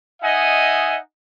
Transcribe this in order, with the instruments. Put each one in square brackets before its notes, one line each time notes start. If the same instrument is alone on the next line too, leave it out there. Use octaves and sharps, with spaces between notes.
[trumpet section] D#4 D#5 E5 F#5 G#5